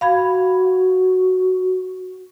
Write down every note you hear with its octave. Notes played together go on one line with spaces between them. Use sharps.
F#4 F5 B5 G#6